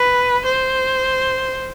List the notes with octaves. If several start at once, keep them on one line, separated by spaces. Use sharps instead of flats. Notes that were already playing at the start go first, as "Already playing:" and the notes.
Already playing: B4
C5